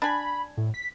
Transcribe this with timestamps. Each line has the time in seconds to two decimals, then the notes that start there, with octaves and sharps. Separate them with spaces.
0.02 D4 G#5 B5
0.57 A2
0.74 B6